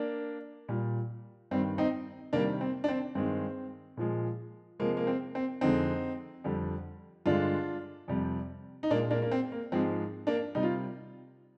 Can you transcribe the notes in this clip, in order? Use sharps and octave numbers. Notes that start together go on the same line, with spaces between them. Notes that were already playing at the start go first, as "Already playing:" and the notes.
Already playing: A#3 D4
A#2 G3
G2 D#3 G3 C4
C4 D#4
C3 D#3 G3 A#3 D4
C4
D4
C4
G2 D#3 G#3 C4
A#2 F3 G#3
C3 F3 G#3 A#3
A#3
C4
C4
F2 D3 G#3 C4 D#4
F2 D3 G3
G2 D3 G#3 D4 F4
F2 C3 G3
D#4
A#2 G#3 A#3 D4
A#3 D4
A#3
C4
A#3
G#2 F3 G#3 C4
A#3 D4
C3 G3 D#4
F4